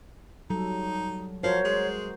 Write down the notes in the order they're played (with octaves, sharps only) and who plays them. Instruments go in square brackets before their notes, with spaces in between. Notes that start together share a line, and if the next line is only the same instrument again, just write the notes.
[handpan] F#3 G3 A4 [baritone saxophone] D#4
[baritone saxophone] F3 [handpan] F#4 A#4 C5 [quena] C#5
[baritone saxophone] G#3